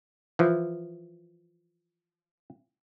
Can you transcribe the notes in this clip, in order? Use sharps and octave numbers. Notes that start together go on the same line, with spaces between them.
E3 F3